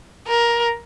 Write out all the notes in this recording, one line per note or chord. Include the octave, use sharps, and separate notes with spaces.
A#4